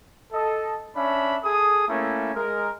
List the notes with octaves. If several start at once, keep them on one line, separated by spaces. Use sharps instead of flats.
A4 D#5
C#4 D4 E5 B5
G#4 A4 D#6
A3 A#3 C#4 E4
G#3 A#4